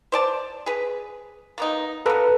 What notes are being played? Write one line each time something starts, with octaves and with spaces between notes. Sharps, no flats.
C5 D5 A5
G#4 B4
A#3 B3 D#4
A#3 B3 A4 B4 A#5